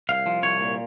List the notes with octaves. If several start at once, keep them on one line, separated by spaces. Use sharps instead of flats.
C2 F5
F3
C2 C#5
A#2